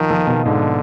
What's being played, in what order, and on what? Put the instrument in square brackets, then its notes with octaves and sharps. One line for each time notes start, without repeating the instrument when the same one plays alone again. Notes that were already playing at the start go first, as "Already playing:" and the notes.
Already playing: [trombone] D#3 [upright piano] F3
[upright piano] F3
B2
[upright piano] G#2 [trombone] D3